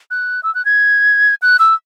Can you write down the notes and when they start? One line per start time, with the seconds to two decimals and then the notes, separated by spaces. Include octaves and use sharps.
0.11 F#6
0.43 E6
0.55 F#6
0.65 G#6
1.42 F#6
1.59 E6